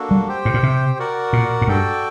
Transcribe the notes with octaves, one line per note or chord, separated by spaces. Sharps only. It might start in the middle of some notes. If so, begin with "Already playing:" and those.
Already playing: A#3 D4 F#4 A4
G3
G4 C5 G5
A2
A#2
C3
F#4 A#4 D5 F#5
A#2
A2
G2 F#4 A4 D5 G5